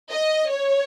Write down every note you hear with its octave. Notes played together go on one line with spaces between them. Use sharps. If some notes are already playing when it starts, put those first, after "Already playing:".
D#5
C#5